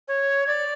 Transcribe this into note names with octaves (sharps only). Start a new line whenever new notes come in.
C#5
D5